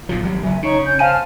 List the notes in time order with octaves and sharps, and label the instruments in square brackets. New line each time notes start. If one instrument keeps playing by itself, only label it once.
[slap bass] B1 A#2 F3
G#1 F#3 G3
[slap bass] F#1 F#3 [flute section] E5 G#5
[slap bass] C#3 [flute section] D#4 C#5 C#6
[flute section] C#4 G6
[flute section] C5 A5 F6 [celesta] F5 G#5 D#7